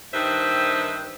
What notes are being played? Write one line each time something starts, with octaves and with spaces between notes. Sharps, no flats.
G2 D#3 D4 B4 C5 E5